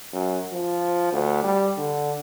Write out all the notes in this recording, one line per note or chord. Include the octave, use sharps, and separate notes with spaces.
F#2
F3
D2
G3
D3